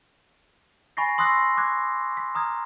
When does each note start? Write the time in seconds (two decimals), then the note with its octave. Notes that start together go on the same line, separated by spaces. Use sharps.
0.97 G#5 B5 C#6 A6 A#6 C7
1.18 C6 D#6 E6 F#6 A#6 C7
1.57 D6 F#6 G#6
2.17 B6
2.35 A#5 D#6 F6 G#6